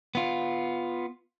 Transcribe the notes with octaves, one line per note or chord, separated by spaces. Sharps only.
B3 F4